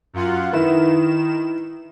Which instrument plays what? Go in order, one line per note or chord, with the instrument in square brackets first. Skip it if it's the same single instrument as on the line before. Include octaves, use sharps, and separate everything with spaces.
[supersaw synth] F#2 F4 F#5
[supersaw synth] D#3 E7 [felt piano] E4 B4